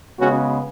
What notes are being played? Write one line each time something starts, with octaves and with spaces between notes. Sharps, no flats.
C#3 G#3 B3 C#4 F#4